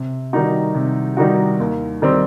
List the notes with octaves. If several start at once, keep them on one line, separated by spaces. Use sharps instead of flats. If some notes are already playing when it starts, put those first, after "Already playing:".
Already playing: C3
D#3 G3 D#4 F#4
C3
D#3 G3 D#4 F#4
D#2
D#3 G3 C4